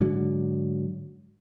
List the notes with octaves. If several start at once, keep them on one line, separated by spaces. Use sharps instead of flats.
G#2 D3 F#3